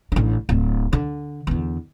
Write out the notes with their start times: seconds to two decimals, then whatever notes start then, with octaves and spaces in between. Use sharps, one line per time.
0.12 A1 D4
0.49 D1
0.93 D3
1.47 E2 D3